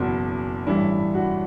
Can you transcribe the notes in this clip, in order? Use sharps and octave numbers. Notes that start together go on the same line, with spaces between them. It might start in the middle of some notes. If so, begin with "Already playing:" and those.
Already playing: F#1 E2 B2 F#4
A1 G2 E3 G3 E4
F#4